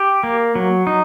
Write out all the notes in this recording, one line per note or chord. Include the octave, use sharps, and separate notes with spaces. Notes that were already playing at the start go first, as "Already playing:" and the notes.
Already playing: G4
A#3
F#3
D#4